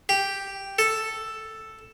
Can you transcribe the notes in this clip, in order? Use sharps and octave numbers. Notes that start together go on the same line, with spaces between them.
G4
A4